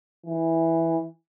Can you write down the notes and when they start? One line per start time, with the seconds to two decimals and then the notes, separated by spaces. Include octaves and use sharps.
0.26 E3